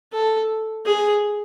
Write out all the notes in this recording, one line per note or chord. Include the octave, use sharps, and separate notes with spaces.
A4
G#4